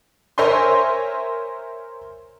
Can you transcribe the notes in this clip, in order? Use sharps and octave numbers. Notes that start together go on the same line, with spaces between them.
A#4 C5 C#5 E5 G#5 C6